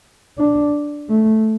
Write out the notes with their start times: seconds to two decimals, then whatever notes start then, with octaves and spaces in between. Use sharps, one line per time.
0.38 D4
1.09 A3